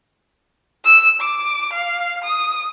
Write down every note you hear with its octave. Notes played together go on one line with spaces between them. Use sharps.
E6
D6
F5
D#6